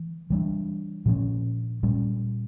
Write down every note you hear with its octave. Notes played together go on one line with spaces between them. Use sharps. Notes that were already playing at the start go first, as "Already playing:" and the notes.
Already playing: E3
E3 G3 D4
A#2 F3 C#4
A#2 G3 C#4